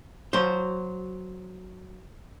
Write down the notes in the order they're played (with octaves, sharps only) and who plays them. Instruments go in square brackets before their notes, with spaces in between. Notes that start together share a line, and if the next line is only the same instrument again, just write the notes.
[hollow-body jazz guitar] F#3 C5